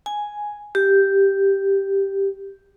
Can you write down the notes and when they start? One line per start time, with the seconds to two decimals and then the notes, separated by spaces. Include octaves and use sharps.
0.06 G#5
0.75 G4